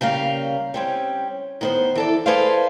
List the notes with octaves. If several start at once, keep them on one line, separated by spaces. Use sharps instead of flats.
C#3 G3 A#3 F5
G3 C4 C#4
D#3 B3 C5
E3 A4 D5
G#4 A4 B4 C5 D5 F5